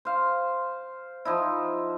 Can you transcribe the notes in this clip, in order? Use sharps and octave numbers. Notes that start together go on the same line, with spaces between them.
C5 F5
F3 D#4 E4